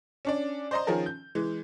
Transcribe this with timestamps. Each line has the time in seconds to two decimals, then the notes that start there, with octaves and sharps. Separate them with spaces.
0.25 C#4 D4 D5
0.71 C5 D5 D#5 A#5 C6
0.87 D#3 F3 C#4 G#4 A#4
1.06 G6
1.35 E3 G#3